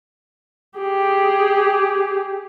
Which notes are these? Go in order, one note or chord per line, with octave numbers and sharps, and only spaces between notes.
G4 G#4